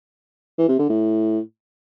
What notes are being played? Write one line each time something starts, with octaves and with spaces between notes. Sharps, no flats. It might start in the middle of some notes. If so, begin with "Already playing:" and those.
E3
C3
D3
A2